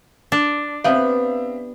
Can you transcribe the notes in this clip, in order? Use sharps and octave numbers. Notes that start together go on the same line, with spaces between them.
D4
B3 C4 G4 E5 F5